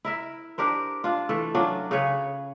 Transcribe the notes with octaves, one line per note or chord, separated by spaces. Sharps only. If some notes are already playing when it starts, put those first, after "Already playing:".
E4 A#4 E5
D4 G4 A#4 C5
D4 F4
E3 A3 A4
F#3 C#4 D4 F4
C#3 G#4 B4 C#5